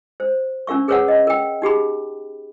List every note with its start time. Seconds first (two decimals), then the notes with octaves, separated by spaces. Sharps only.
0.20 C5
0.67 C#4 D4 A#4 F5 C#6
0.88 G#4 A#4 B4 C#5 F5 F#5
1.08 D#5
1.27 A#4 G5
1.62 D#4 G4 G#4 B5